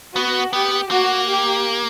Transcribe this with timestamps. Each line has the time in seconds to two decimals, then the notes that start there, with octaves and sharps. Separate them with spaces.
0.15 B3 F#4
0.53 B3 G4
0.90 A#3 F#4
1.28 G4